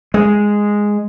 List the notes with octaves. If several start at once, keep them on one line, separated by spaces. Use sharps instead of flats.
G#3